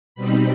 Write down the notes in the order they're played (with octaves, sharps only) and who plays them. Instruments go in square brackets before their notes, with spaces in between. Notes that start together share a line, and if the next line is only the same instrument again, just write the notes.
[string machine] B2 G3 C4 D#4 B5